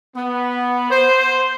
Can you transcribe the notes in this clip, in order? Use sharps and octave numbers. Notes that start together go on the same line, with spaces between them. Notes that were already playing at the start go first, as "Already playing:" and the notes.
B3
C5